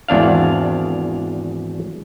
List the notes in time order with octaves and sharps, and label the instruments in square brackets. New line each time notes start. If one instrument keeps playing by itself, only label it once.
[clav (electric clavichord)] G#1 E2 D4 F5